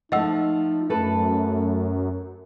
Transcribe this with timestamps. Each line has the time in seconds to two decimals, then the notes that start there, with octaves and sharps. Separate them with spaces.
0.12 F3 A3 D#4 D#5 F#5 E6
0.90 F#2 A3 A4 B4